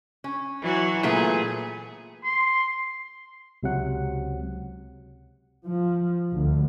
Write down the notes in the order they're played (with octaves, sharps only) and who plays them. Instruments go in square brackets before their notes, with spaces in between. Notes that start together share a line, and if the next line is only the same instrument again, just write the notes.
[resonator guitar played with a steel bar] C#4
[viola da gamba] E3 F#3 F#4
[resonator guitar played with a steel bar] A#2 A3 B3 [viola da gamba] G#4
[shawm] C6
[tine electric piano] C#2 C3 F#3 F#5
[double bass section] F3
D2